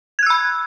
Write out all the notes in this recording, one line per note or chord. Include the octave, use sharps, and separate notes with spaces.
B5 E6 F#6 G#6